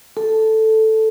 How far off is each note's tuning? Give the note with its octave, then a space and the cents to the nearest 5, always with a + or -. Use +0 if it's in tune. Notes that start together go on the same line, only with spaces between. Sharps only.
A4 +0 A5 +0